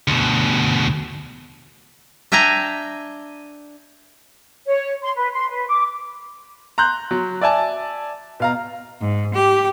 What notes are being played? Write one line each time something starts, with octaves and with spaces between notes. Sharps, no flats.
D2 B2
D4 E5 G5 G#5 A#5
C#5
C6
B4
C6
B4
D6
A#5 C6 F#6 G6
F#3
D5 E5 G#5 A5
B2 F5 A#5
G#2
G4